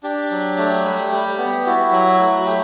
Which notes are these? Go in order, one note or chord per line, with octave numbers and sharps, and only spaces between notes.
D4 G4
F#3
A3
G3
G3
B3
E4 F#4
F#3
A3
F#4
A3 G4